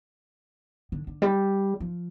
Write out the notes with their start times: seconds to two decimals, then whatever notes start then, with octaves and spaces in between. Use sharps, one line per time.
0.92 D3
1.07 D3
1.22 G3
1.80 F3